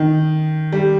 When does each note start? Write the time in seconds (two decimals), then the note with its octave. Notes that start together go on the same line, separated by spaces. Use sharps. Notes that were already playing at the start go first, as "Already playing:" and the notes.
Already playing: D#3
0.73 G3